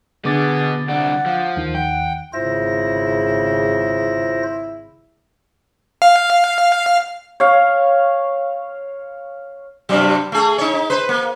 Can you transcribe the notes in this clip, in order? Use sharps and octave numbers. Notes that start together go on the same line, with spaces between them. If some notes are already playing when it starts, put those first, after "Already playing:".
B2 D3 B3 G#4 D6 A6
C2 D4 F#5
F3
D#2 D#3
F#5 G5
G#1 C#3 E4 F4 C5 A#6
F5
C#5 F5
G2 C3 F#3
A3 G#4
D#4 C#5
D#4
B4 C5
A#3